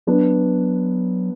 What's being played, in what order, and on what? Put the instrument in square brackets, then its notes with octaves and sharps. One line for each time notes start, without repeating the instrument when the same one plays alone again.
[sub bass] F#3 [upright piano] B3 D4